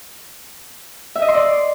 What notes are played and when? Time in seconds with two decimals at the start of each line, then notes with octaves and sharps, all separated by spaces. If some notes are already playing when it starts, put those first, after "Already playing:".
1.16 E5
1.22 D#5
1.28 C6
1.35 D5